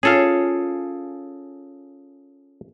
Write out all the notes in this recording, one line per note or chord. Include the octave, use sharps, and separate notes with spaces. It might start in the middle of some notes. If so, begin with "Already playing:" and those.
C#4 F4 G#4 A4 F5